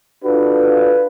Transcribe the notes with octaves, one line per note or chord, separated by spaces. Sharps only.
D4 F4 F#4 A4 B4